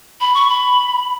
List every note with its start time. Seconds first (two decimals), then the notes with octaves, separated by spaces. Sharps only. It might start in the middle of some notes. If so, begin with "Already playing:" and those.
0.21 B5
0.34 C#6
0.49 B5